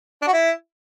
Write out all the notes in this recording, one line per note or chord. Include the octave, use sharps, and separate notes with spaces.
D4
F#4
E4